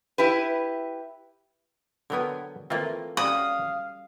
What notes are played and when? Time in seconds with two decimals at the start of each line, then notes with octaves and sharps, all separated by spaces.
0.18 E4 G4 B4
2.10 D3 F#3 B3 A#4 G5 G#5
2.70 E3 A3 A#3 C4 F4
3.17 G3 C#4 F#4 F5 D#6